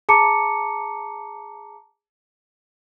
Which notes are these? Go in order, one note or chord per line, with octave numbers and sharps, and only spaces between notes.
G#4 A5 A#5 D6 C#7